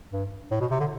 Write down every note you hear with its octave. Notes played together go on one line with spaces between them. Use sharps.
G2
A2
B2
C3
D3